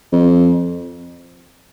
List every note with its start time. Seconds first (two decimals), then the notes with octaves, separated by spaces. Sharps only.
0.12 F2